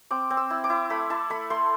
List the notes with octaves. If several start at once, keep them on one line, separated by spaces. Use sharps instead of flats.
C4 D6
C4
E6
E4
D6
E4
A3 B5
E4 A5
A3 B5
A3 C6